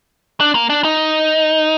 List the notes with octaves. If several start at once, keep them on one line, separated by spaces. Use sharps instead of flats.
D4
A#3
D4
D#4